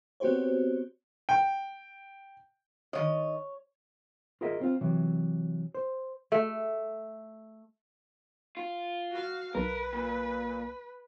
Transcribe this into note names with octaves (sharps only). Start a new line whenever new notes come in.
B3 C4 F#4 G4 C5 C#5
G5
D#3 E3 C#5 D#5
F4 G#4 A#4 D#5 E5
C4 F4
C3 E3 F#3
C5
A3
F4
F#4 F5
B1 A#4 B4
A#2